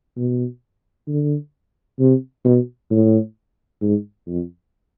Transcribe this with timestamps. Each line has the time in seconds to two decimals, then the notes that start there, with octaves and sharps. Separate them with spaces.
0.17 B2
1.08 D3
1.99 C3
2.45 B2
2.90 A2
3.81 G#2
4.27 F2